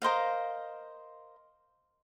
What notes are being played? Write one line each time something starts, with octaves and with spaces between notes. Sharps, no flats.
A#4 C5 D#5 F5